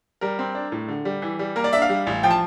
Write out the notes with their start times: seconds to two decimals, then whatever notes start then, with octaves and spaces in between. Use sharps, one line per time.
0.21 G3 A#4
0.39 C4
0.55 D4
0.72 A2
0.88 D3
1.05 G3
1.22 E3
1.39 G3
1.56 A#3 A#4
1.64 D5
1.73 D4 E5
1.82 F5
1.89 G3
2.07 A1
2.23 F3 G5
2.31 A5